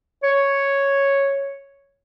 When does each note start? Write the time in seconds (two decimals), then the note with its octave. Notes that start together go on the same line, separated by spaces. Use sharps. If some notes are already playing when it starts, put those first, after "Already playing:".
0.23 C#5